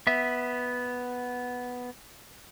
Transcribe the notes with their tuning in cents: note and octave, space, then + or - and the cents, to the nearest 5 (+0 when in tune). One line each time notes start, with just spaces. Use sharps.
B3 +0 E5 -15